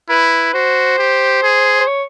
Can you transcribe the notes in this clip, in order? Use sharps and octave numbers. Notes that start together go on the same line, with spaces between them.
E4 B4
F#4 C5
G4
G#4
C5
C#5